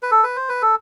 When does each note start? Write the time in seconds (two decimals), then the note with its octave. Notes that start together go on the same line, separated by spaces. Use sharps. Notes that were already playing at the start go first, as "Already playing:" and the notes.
0.02 B4
0.11 A4
0.23 B4
0.36 C5
0.49 B4
0.62 A4